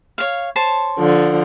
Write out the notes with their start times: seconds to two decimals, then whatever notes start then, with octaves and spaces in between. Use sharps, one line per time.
0.18 C#5 F5
0.56 C5 C#5 A5
0.99 D3 F3